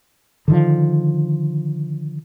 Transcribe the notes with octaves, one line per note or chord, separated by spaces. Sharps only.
D3 D#3 F3